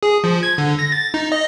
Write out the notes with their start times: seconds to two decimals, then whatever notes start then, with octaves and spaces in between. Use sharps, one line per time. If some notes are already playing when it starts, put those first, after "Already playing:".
0.03 G#4
0.24 F3
0.43 G#6
0.58 D3
0.79 A#6
0.92 A6
1.14 D#4
1.32 D#5